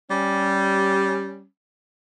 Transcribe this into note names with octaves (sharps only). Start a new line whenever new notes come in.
G3 C#4